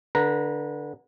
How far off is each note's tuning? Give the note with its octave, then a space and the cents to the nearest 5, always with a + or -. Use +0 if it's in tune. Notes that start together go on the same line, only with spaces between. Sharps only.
D3 +0 B4 -25 A#5 +0